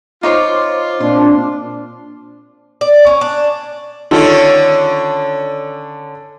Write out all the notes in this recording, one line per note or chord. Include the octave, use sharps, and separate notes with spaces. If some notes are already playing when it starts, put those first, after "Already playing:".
D#4 F4 C5 C#5 C6 D6
A#2 C4 D4 C6
D5
C#4
D4
D3 D#3 C#4 F4 A4